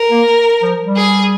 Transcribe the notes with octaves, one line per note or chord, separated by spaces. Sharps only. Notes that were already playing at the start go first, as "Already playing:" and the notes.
Already playing: A#4
A#3
F3
G3
G#4